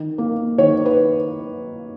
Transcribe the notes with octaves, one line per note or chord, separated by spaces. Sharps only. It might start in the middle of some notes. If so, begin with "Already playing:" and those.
Already playing: D#3
A#3
D#3 C#5
B4